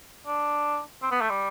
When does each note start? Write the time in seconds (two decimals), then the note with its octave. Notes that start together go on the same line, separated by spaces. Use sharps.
0.26 D4
1.02 C4
1.11 B3
1.21 A3
1.30 G3